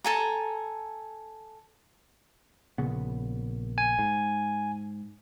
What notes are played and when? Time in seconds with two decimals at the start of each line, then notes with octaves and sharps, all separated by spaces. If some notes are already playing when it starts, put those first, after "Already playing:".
0.04 A4 G#5 A#5
2.78 A#1 C#3 B3
3.78 G#5
3.99 G#2